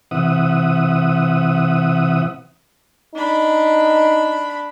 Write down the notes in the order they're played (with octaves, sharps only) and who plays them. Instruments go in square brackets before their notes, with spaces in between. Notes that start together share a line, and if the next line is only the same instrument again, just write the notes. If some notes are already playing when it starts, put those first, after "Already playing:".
[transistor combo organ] C3 E3 E5 F#5 D#6
[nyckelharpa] D4 B5 [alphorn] D#4